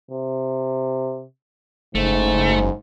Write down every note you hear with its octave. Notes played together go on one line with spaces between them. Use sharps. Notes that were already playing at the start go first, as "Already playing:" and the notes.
C3
F#1 G#2 A3